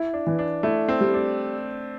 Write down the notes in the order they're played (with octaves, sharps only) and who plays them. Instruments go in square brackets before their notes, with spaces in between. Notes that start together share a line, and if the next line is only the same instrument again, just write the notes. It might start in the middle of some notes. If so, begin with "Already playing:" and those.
Already playing: [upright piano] E4
[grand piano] D4
[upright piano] E3
[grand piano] D4
[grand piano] A3 [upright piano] E4
[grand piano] C4
[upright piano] G3
[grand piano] D4